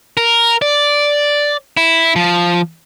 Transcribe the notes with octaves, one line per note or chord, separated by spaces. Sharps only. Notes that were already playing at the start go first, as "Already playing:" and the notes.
A#4
D5
E4
F3